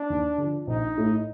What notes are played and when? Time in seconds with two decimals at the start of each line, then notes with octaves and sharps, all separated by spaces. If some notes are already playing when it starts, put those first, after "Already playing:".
Already playing: D4
0.10 D#2
0.38 D3
0.43 F3
0.67 A#1 D#4
0.97 A2 A3